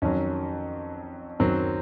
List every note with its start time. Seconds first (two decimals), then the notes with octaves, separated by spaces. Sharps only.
0.02 F2 D#3 F#3 C#4
1.40 F#2 D#3 F#3 C4